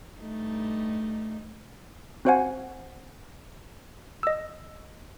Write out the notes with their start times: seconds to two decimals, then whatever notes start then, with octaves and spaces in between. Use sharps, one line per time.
0.17 G2 A3 D#4
2.25 C4 F#4 C5 F5 F#5 G#5
4.23 D#5 E6